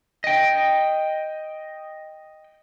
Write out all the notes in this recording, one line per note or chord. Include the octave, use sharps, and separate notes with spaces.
D#5 G5